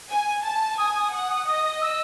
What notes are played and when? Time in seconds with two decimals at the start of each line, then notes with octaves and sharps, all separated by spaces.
0.09 G#5
0.44 A5
0.78 G#5 D#6
0.96 D#6
1.12 F#5 D#6
1.30 D#6
1.46 D#5 D#6
1.81 E6